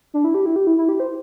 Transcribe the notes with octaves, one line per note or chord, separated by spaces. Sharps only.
D4
E4
G4
E4
G4
E4
E4
G4
C5